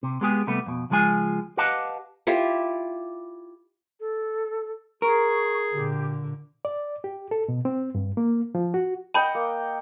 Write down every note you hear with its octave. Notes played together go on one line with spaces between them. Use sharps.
C3
G#3 B3 G4 G#4
C3 G3 A3 B3
F2 B2
C#2 F3 G#3 F4 G#5
G4 B4 D#5 F5 F#5 A5
E4 F4 G4
A4
G#4 A#4 C#6
A#2 D3 G4
D5
G4
A4
B2
C4
G2
A#3
F3
F#4
D#5 F#5 G5 A5 B5 G6
A#3